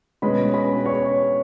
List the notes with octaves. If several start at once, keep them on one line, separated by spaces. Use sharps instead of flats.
B2 G#3 C#4 B4 B5
B4 B5
C#5 C#6